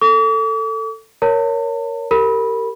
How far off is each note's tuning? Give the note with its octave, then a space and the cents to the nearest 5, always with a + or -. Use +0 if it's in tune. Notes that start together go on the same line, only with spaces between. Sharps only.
A4 +15 D6 -45
A#4 +0 C#5 +5 A5 +45
G4 +0 A#4 -25 B5 -15